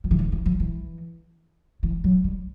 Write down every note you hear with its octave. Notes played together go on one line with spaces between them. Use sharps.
F3
E3
D#3
E3
F3
E3
E3
F#3
G3